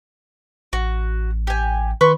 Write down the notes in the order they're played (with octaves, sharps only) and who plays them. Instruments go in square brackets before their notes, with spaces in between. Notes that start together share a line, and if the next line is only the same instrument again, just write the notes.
[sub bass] A1 [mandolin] F#4
[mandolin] G4 G#5
[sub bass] D#3 [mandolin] B4 C6 C#6